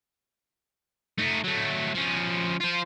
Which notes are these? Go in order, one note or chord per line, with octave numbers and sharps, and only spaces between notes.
A3 D#4
F#3 A3
F3 C#4
F4 C5